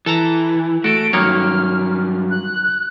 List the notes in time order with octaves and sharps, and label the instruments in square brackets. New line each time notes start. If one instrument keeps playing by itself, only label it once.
[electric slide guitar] E3 [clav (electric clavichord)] A4 A5 A#5
[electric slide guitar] A3 [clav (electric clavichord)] F#4 A4 [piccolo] D7
[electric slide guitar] G2 F#3 [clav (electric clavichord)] D#3 A#3 C#5 [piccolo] F6
[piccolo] F#6